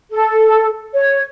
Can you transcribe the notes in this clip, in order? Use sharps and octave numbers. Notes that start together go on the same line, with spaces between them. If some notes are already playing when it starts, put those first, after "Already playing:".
A4
C#5